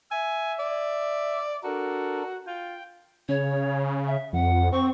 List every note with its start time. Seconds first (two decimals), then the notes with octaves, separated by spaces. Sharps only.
0.11 E5 G#5
0.59 D5
1.64 D4 F#4 A4 A#4
2.47 F4 G5
3.29 C#3 C#5
4.07 E5
4.33 F2 F#5
4.72 C4 C#6